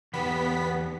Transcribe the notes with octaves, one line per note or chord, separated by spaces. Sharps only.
E2 B3 G4 B6